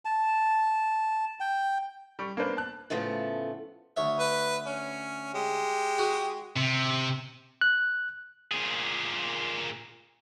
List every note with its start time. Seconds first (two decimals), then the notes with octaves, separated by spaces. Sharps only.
0.05 A5
1.40 G5
2.19 G3 C#6
2.37 A#3 B3 D4 B4 C5
2.57 A5 F#6
2.90 A2 C#3 F3 A3 B3
3.97 D2 C#5 E5
4.20 B4
4.66 C#4
5.34 G#3 G4
5.98 F#4 G#4
6.57 C3
7.61 F#6
8.52 A#2 G#4